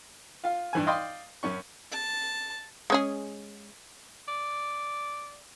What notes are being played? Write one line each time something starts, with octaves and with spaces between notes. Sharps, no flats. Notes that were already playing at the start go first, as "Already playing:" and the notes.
F4 F5
G2 E3 G#5
D5 D#5 F5 G5 C6
F#2 C#4 C#6
A5
G#3 C#4 G#4
D5